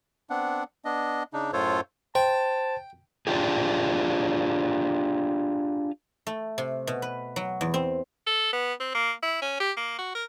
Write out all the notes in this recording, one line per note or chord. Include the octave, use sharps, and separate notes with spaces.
B3 C4 D4 F#5
B3 D4 D#5
C#3 D4 D#4
F#2 A2 F4 A4 C5 C#5
C5 G5 A5
D4 F4 G4 G#4
A3
C3
B2
B4
F#3
E2
C4
A4
B3
C4
A#3
E4
C#4
G4
A#3
F#4
A#4